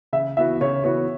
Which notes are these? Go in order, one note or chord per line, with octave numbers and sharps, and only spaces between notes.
C#3 E5
E3 B3 F#4 E5
C#3 C#5
E3 B3 F#4 C#5